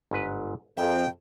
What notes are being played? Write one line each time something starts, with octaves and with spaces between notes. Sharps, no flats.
G1 G#2 B4
F2 G#4 A#4 E5 G5